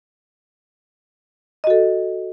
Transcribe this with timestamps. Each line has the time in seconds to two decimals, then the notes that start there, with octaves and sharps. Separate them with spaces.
1.64 D#5
1.67 F#4
1.70 A4